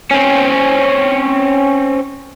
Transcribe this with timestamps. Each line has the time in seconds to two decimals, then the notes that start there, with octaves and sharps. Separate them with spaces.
0.11 C4 C#4